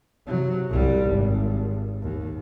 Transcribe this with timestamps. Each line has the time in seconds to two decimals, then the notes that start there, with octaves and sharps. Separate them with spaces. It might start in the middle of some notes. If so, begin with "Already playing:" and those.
0.27 C3 F#3
0.69 C2 G3
1.06 G#1
2.01 D#2